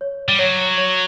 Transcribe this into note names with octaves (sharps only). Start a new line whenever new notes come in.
C#5
G3
F#3 C#5
C#5